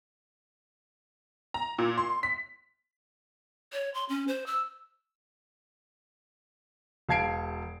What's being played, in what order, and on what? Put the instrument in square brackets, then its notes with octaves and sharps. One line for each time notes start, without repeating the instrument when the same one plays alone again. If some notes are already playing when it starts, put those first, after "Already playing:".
[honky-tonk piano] A#5
A#2
C6
B6
[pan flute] C#5
C6
C#4
C5
E6
[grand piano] E1 F5 A5 G#6 C7 D7